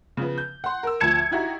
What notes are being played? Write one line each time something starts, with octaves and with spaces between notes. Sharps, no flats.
C#3 F3 B3
G6
F#5 C6
A#4 E6
D2 F3 A5 G#6 C#7 E7
D#4 E4 F#4 G4 A#5